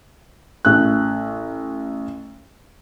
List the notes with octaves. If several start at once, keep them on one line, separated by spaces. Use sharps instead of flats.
A1 F#6